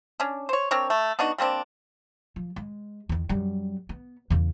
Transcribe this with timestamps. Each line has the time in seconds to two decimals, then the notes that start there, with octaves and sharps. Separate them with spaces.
0.20 C#4 D4
0.49 C5 C#5
0.71 C4 D4 A#4 C#5
0.90 A3
1.19 B3 D4 D#4 F#4
1.38 G3 A#3 C4 D4
2.36 F3
2.56 G#3
3.09 E2 D#3
3.29 F#2 G3
3.89 B3
4.30 E2 C#3